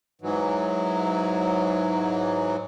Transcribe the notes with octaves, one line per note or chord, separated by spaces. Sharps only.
G#2 E3 F#3